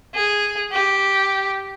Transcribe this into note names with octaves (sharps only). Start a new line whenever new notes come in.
G#4
G4